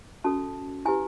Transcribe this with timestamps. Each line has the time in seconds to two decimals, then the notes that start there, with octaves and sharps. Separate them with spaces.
0.24 C#4 F#4 A4 A5
0.85 E4 G4 B4 G#5